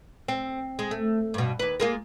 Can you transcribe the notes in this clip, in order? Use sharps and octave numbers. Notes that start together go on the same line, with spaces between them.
C4
G#3
A3
G2 B2
D#2 B4
G#3 A#3 F4